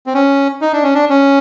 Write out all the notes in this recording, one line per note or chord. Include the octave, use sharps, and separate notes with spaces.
C4
C#4
D#4
D4
C#4
D4
C#4